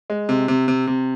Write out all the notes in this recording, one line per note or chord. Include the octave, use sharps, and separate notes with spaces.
G#3
C3
C3
C3
C3